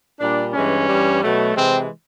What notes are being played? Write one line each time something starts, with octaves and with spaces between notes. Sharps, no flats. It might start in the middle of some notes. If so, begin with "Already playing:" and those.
A#2 G3 D4
G2 E3 G#3 C#4
G2 E3 G3
B2 F#3 A3
C3 E3 G#3 C4